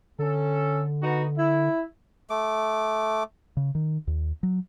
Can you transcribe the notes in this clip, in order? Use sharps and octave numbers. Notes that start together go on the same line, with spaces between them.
D3 C#4 A4
B3 D#4 F#4
E4
A3 D6
C#3
D#3
D#2
F#3